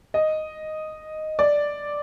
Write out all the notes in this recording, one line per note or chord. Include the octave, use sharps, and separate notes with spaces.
D#5
D5